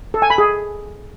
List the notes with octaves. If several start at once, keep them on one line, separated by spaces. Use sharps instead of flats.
A4
G#5
B5
G#4